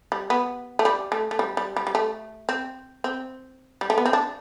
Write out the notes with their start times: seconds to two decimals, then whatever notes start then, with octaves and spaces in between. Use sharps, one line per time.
0.12 G3
0.30 B3
0.79 A3
0.85 G3
1.12 A3
1.31 A3
1.39 G3
1.57 G3
1.77 G3
1.87 G3
1.95 A3
2.49 C4
3.04 C4
3.81 G3
3.90 A3
3.98 B3
4.05 C4
4.13 D4